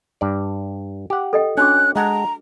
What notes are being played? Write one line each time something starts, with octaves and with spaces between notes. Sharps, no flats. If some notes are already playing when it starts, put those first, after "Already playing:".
G2 D5
G4 F#5
A4 D#5 G5
C#4 D4 F#4 D6 F#6
G#3 F#5 A5 A#5